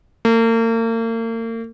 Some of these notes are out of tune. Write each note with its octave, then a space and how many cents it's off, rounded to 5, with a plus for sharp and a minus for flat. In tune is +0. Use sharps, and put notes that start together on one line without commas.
A#3 -40